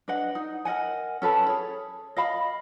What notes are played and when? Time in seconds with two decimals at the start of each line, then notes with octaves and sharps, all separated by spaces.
0.08 D4 B4 D#5 F#5
0.35 D#4
0.65 A#4 D#5 F#5 G#5
1.22 C#4 A4 B4 A5
1.48 G#4 C#5
2.17 D#5 F5 B5